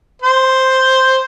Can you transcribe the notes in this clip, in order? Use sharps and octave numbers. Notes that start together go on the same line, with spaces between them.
C5